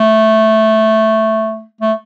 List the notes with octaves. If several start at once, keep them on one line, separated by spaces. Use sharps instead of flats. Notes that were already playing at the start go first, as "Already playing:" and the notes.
Already playing: A3
A3